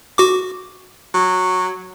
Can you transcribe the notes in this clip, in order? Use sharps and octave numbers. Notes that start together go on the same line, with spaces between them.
F#4 D6
F#3